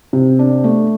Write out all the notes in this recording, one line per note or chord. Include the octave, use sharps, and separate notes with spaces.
C3
D4
A3